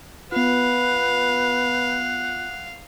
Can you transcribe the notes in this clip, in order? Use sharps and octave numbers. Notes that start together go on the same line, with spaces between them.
B3 F4 B4 F5 F#5